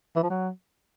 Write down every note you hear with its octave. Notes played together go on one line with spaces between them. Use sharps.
E3
F3
F#3